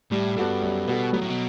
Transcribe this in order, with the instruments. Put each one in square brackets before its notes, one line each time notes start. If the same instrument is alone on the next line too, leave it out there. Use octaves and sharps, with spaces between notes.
[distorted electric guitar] A2 [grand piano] G3
[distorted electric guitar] G2 [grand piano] B3 F#4 A4
[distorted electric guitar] F#2 [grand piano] G3
[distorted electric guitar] B2 [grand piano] B3 F#4 A4
[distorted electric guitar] B2 [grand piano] F#3
[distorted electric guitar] A2
B2